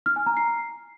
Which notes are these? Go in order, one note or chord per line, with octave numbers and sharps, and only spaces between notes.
F6
G#5
A#5
C7